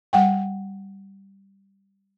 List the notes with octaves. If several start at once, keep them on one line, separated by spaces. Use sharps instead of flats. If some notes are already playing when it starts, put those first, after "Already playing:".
G3 F#5 G5